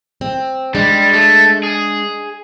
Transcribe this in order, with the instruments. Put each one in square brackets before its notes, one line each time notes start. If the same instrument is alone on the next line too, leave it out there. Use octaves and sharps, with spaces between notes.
[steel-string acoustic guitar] C4
[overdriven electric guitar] G3 [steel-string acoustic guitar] G#3 D4
[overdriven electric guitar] A3
G#4